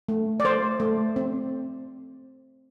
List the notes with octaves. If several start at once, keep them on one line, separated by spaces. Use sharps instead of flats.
A3
D5
A3 C5
A3
C4